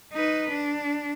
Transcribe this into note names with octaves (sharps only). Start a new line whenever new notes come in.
D#4 B4
D4